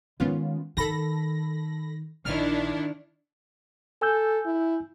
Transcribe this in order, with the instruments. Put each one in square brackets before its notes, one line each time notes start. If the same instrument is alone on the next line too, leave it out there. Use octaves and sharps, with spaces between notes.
[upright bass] D#3 G#3 [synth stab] B3 C#4 F4
[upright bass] D#3 [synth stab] A4 B5 A#6
[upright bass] A#1 [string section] D#3 D4 E4 [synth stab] F6
[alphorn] A4 [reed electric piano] G#5 E6 G6
[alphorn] E4